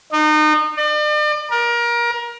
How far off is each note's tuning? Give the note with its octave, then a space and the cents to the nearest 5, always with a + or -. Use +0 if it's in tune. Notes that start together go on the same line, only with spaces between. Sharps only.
D#4 -30
D5 +40
A#4 +25